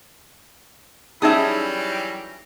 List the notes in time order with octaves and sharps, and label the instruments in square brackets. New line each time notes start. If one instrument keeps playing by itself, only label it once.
[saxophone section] E3 F#3 G3 [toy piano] C#4 D#4 D#6 [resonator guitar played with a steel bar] G#4 E5